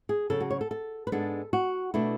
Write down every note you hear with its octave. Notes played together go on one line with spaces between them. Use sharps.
G#4
C#3 F#3 C#4 A4
F#4
C#5
A4
A4
B4
G#2 G#3 B3 D4 A4
F#4
B2 A3 D4 E4